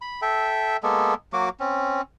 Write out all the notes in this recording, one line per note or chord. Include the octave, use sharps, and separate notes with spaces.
B5
A4 E5 G5
G#3 A#3 B3 A4
F#3 A#3 F#4 D6
C4 C#4